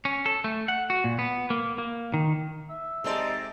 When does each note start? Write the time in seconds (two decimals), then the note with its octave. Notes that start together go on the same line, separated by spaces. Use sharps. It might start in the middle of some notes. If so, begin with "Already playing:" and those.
0.05 C#4
0.26 A4
0.44 A3
0.68 F#5
0.90 F#4
1.04 A#2
1.19 B3
1.50 A#3
1.78 A#3
2.14 D#3
2.70 E5
3.04 C3 G#3 C4 D#4 A4 C5 D5